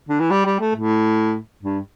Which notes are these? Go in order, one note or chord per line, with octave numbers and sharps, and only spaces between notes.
D3
E3
G3
G3
A3
A2
G2